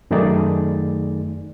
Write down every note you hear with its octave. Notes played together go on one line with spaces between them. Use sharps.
F#2 D#3 A3 D#4 G#4 D5